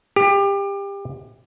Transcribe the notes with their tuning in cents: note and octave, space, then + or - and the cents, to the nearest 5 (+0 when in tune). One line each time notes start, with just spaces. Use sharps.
G4 +25